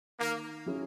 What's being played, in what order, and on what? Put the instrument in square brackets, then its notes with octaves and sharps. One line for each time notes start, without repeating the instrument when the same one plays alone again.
[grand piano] D#3 [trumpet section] A#3
[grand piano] F#3 C#4 E4 G#4